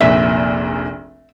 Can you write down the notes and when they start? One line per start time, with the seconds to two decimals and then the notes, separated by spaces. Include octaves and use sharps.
0.01 F1 A#1 A#2 E5